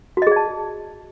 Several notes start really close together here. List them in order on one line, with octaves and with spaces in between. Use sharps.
F#4 D#5 G#4 D5 A5